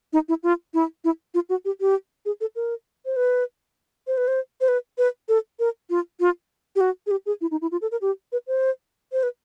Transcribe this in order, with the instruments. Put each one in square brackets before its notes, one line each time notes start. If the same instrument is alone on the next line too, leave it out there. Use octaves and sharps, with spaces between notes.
[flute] D#4
E4
F4
E4
E4
F4
F#4
G4
G4
G#4
A4
A#4
C5
B4
C5
B4
C5
C5
B4
B4
A4
A#4
F4
F4
G4
F#4
G#4
G4
G#4
E4
D#4
E4
F4
A4
A#4
G4
B4
C5
C5
B4